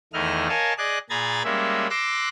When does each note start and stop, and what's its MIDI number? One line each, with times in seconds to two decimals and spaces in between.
0.13 0.48 40
0.13 0.48 51
0.13 0.48 57
0.13 0.48 64
0.13 0.48 75
0.13 0.48 89
0.49 0.73 70
0.49 0.73 73
0.49 0.73 75
0.49 0.73 77
0.49 0.73 80
0.49 0.73 81
0.78 0.98 68
0.78 0.98 74
0.78 0.98 75
0.78 0.98 90
1.10 1.42 46
1.10 1.42 68
1.10 1.42 82
1.10 1.42 83
1.10 1.42 92
1.10 1.42 93
1.44 1.87 55
1.44 1.87 56
1.44 1.87 58
1.44 1.87 61
1.44 1.87 76
1.90 2.29 84
1.90 2.29 86
1.90 2.29 88
1.90 2.29 90
1.90 2.29 94